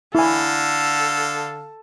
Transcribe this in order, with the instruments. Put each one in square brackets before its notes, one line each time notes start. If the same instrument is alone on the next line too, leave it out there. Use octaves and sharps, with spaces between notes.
[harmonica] D3 F5 [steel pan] E4 G#5 [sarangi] A4